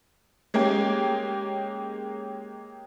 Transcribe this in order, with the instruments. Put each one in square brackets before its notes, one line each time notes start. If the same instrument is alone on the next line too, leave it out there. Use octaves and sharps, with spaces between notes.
[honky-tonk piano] G#3 A#3 C#4 G4